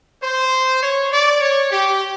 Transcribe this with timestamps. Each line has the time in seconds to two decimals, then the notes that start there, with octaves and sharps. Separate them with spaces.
0.23 C5
0.82 C#5
1.12 D5
1.41 C#5
1.71 G4